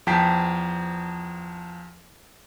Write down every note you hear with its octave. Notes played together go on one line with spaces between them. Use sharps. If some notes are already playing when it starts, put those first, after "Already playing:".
E2 F3 G5 A5 B6 C7